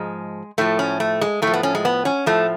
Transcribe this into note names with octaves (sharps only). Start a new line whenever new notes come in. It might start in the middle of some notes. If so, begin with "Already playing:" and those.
Already playing: G#2 F3 G#3
A2 F3 A3
C#4
A3
G#3
A2 A3
F3
B3
C#4
G#3
B3
C#4
A2 F3 A3